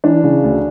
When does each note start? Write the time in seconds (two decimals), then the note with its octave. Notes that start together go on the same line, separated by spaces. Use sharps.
0.04 E3 D4
0.23 C#3
0.43 D2